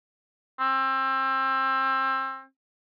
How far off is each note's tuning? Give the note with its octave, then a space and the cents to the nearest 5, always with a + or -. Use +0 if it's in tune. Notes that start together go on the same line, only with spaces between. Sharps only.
C4 +30